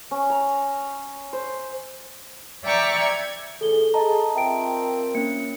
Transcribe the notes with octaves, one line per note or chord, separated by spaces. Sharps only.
C#4
A#5
C5
D5 E5 G5 A#5 C#6 D6
G#6
A2 E3 G#4 A4 G7
G#4 D#5 A5 A#5
C4 F4 A#4 E5 G5 D7
A#3 C#4 C#7